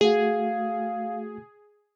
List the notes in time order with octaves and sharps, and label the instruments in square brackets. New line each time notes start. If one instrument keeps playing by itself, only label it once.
[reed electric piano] A3 F#4 [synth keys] G#4 [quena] F5